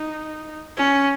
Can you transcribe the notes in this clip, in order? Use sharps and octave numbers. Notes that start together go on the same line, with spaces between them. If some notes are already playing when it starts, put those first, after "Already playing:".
Already playing: D#4
C#4